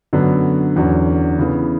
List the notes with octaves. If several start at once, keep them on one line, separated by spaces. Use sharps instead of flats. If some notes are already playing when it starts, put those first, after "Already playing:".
F#2 D3 F#3 B3
E2 D3 F#3 C#4
C#3 E3 B3